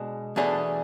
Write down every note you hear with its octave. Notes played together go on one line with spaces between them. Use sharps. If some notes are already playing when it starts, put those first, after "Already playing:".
Already playing: B2 G#3 D4
E2 B2 A3 D4 G#4